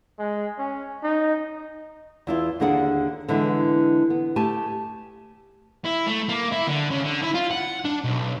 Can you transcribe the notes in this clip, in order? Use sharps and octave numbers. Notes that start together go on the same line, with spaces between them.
G#3
C#4
D#4
E2 E4 F4
D#2 D3 A#3 D4 G#4 F#5
D3 E3 G#3 B3 E4
B3
A3 G4 G#5 A5
E4
A3
A#3
E4
D3
C#3
D3
E4
F4
F#5
D4
B1